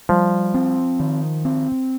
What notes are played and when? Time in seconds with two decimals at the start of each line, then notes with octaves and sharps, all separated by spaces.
0.09 F3 G3
0.54 C4
1.00 D#3
1.45 C4